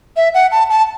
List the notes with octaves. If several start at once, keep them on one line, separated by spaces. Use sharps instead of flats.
E5
F#5
A5
A5